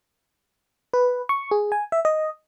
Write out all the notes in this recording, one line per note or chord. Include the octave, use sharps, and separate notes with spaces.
B4
C#6
G#4
G#5
E5
D#5